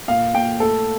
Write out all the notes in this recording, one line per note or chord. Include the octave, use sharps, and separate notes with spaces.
A#2 F5
A#2 G5
A3 A4